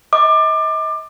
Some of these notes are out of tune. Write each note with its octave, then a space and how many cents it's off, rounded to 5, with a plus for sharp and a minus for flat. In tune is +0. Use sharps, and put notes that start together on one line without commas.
D#5 +40 D6 +25